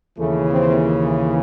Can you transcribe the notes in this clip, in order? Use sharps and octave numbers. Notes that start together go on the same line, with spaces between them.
D#2 C#3 E3 A3
C4